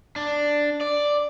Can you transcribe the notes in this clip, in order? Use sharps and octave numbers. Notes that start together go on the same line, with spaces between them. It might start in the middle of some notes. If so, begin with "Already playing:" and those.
D4
D5